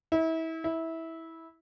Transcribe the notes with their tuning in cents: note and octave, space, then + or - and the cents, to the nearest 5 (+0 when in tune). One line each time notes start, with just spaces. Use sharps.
E4 -30
E4 -15